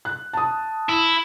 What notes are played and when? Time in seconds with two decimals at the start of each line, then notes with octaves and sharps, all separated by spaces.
0.05 F#6
0.33 A5 D#6
0.89 E4